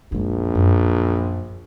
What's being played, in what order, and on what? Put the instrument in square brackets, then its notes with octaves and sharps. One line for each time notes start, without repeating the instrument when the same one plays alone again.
[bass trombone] A#1 [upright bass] F#2 G#3
[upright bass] F#2